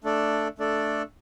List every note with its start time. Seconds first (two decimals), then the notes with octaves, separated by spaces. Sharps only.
0.04 A3 D4 A4 D5
0.59 A3 D4 A4 D5